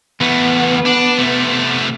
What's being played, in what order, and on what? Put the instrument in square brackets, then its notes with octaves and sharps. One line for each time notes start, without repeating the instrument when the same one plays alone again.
[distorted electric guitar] E2 A3 [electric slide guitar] B3
[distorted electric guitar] D4
C3 A3